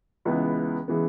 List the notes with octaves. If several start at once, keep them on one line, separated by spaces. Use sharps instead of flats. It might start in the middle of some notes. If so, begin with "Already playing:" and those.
C#2 C#3 E3 G#3 B3
C#3 E3 G#3 B3